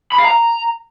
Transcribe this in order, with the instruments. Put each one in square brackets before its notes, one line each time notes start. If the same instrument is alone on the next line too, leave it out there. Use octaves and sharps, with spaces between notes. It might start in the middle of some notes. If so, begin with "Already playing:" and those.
[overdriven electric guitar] B5
F5
A#5